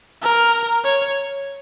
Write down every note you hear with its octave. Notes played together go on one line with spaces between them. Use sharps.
A#4
C#5